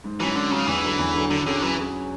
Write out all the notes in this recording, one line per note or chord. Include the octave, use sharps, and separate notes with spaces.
G#2
E3 F#3 C#4
G#2 D3
C#3 F#3 C#4
E2 E3
D3 F#3
E2
D3 F#3
D3 F#3
D3 C#4 G#4
E3 F#3
C#4 G#4